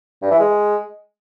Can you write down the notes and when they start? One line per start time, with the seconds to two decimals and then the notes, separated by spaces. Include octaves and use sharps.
0.22 G2
0.31 E3
0.40 G#3